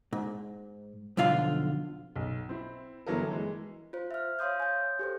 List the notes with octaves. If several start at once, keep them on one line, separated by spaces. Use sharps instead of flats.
G#2
B1 F2 D3 F4 F5
B1
C4 E4
G1 E3 F#3 B3 A4 A#4
E3 G#3
F4 C5
E5 F6
C#5 F5 C6 D#6 G6
G#5 G6
G4 A4 C5